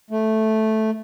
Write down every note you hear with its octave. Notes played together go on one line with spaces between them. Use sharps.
A3